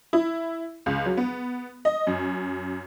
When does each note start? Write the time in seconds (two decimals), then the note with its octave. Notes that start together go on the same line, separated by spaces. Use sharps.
0.13 E4
0.86 C#2
1.06 F#3
1.17 B3
1.85 D#5
2.07 F#2